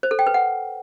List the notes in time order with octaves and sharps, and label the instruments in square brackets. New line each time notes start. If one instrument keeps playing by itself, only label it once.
[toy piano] C5
A4
G5
B4
F#5